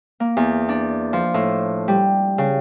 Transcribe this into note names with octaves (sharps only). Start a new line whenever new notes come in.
A#3
E2
D4
F3
A2
G3
C#3